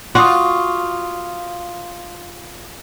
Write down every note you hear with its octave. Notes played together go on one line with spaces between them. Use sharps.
F4 F#4 C6 D6 D#6